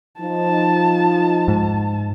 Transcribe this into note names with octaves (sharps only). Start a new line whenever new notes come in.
F3 D#4 A5
G#2